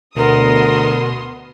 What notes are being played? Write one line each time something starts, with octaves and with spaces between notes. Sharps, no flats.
D2 B2 B3 A#4 C6 D#6